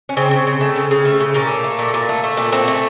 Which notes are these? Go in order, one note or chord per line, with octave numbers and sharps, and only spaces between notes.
C#4
C#3 C4
C#3
C#3
A3
C#3
C#3
A3
C#3
A#2 A#3 C#4
A3
A3
A#2
A#2
A3
A3
A#2
A3 C4
A3